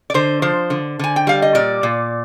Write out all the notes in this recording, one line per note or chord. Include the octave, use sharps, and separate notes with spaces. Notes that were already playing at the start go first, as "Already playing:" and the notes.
D5
D3 C5
F3 C5
D3
D3 G#5
G5
G3 F5
D#5
A#2 D5
A#2